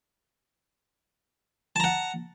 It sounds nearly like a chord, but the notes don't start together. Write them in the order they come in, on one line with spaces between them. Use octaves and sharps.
A5 A#5 F#5